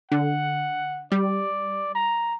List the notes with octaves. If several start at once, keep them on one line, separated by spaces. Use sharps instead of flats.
D3 F#5
G3 D5
A#5